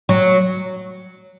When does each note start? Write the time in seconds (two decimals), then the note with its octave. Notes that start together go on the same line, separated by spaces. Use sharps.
0.09 F#3